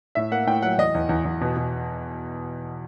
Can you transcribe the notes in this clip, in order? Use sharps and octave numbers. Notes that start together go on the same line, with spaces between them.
A2 E5
A#3 F#5
A2 G5
F#3 F#5
E2 D#5
E2
E2
E2
B2
B2